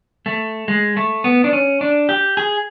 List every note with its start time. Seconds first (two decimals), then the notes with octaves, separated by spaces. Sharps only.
0.26 A3
0.68 G#3
0.97 A3
1.24 B3
1.44 D4
1.53 C#4
1.81 D4
2.09 G4
2.37 G#4